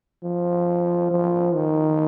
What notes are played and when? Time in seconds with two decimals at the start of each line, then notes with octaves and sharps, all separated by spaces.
0.23 F3
1.11 F3
1.54 D#3